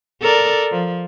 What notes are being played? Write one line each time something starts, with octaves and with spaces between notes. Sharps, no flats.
A4 A#4 D5
F3